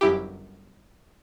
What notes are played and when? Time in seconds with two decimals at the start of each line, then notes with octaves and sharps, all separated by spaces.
0.01 G1 F#2 E4 G4